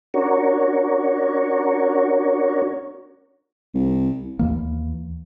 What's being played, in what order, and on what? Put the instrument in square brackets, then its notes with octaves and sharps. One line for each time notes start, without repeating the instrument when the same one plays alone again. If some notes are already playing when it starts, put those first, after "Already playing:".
[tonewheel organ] C#4 D4 F#4 A#4 C#5
[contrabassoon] C2
[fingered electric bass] D#2 E3 A#3